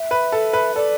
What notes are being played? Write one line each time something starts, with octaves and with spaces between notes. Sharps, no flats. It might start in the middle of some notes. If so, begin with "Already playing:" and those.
Already playing: E5
B4
A4
B4
A4 D5